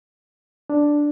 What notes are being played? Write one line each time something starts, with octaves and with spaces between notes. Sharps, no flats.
D4